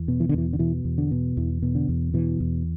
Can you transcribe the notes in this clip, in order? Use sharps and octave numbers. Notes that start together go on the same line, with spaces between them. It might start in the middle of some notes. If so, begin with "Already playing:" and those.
Already playing: E2
B2
E3
D3
E2 E3
D3
B2 E3
E2
D3
B2
E2 E3
B2
D3
E2
B2 E3
E2